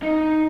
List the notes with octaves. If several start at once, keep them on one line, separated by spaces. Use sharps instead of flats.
D#4